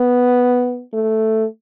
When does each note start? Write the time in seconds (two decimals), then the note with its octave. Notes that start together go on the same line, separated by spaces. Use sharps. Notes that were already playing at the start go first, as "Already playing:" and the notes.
Already playing: B3
0.93 A3